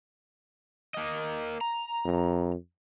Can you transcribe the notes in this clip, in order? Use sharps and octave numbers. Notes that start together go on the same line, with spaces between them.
A#3 D#5
A#5
F2